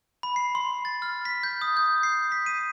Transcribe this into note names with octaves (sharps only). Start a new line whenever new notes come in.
B5
C7
C6
A6
F6
B6
G6
D#6
G6
C7
B6
D#7